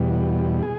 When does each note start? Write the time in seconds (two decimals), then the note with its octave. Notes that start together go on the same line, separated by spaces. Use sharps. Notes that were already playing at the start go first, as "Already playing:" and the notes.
Already playing: E2 B2 G3
0.63 G#4